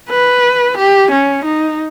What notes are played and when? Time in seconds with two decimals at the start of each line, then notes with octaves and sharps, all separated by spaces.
0.09 B4
0.77 G4
1.11 C#4
1.44 D#4